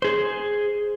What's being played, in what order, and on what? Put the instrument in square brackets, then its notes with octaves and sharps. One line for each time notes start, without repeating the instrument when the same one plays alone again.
[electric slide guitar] G#4 C5